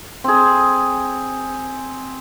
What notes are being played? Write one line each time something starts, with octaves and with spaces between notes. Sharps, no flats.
C4 G#4